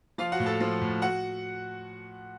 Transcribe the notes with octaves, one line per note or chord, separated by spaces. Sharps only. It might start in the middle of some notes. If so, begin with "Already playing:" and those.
F3 F4 F5
F#4 F#5
A2
A4 A5
F3
A2
F#4 F#5